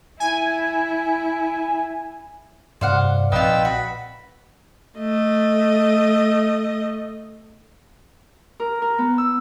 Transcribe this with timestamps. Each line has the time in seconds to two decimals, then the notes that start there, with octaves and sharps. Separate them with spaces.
0.20 E4 G#5
2.81 G2 C3 C5 D5 F5 F#5
3.32 A#1 C4 D#4 F4 B4 G5 E6
3.65 F#4 B5
4.98 A3 D#5
8.60 A#4
8.82 A#4
8.98 B3
9.18 E6